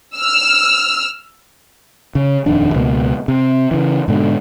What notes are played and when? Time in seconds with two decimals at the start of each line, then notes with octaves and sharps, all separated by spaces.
0.17 E6 F6
2.15 C#3
2.46 D#1 F2 D#3 D4
2.74 C#2 B2 A3 A#3
3.28 C3
3.71 C#3 E3
4.08 G#2 B2 D3